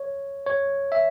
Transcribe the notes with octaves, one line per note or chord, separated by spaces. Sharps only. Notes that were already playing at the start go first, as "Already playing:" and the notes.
Already playing: C#5
C#5
E5